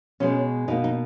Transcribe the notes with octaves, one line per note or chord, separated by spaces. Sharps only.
B2 G#3 B3 C#4
B2 A#3 D#4
D#4